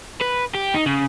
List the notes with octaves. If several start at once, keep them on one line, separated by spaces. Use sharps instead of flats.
B4
G4
D#4
C#3